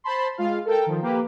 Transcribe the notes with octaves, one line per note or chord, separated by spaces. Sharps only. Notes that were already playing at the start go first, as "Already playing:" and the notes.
C5 A5 B5 C6
G#3 F4 F5
A4 A#4 G5
D#3 F3
A#3 G4 B4